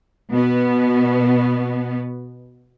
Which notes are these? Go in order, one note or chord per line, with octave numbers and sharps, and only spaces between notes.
B2 B3